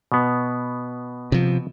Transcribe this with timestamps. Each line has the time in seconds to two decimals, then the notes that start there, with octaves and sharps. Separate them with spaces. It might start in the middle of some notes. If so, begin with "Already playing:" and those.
0.12 B2 B3
1.32 C3 F3